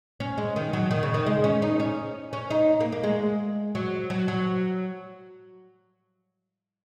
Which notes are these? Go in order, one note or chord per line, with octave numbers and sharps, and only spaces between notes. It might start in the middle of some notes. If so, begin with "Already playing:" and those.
C#4
G#3
D#3
F#3
D#3
C#3
D#3
G#3
C#4
D#4
C#4
C#4
D#4
A#3
A#3
G#3
F#3
F#3
F#3